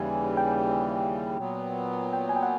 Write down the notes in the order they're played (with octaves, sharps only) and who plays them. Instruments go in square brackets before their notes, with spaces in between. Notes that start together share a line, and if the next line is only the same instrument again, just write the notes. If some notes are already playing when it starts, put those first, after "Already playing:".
Already playing: [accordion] D#2 C#3 E3 G3 [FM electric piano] G#5
[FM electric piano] G5
[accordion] A#2 F#3 B3
[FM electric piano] G5
G#5
G5
F#5